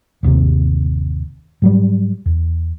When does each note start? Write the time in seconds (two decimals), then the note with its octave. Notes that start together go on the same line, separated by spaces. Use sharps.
0.23 G1 D#2 C3
1.62 G#2 F#3 G3
2.26 E2